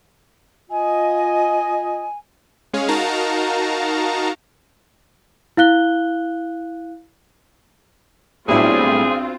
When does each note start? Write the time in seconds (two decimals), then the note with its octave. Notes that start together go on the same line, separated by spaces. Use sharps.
0.70 F4 D#5 G#5
2.73 G#3 C#4 G#4 C#5 F5
2.88 D#4 F#4 A#4 F5 A5 A#5
5.57 E4 F5 F#6 G7
8.48 B1 A2 G3 C4 D4 E4 F4 G#4